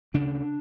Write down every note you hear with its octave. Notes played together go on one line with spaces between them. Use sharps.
D2 C#3 D4